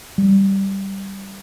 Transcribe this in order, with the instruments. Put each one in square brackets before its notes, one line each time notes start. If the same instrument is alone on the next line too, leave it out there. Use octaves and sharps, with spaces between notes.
[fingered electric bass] G3